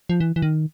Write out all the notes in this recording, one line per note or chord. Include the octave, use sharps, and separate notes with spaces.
F3
E3
E3
D#3